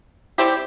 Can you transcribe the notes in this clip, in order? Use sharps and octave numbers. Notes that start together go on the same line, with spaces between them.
G3 C4 E4 G4